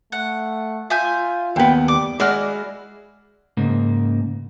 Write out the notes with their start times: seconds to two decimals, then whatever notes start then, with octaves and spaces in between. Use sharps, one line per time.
0.12 A3 F#5
0.90 F4 E5 G#5 G6
1.56 D#2 B3 G5
1.88 G3 D6
2.20 G#3 E4 F#4 D5 F6
3.57 G#2 C#3 A#3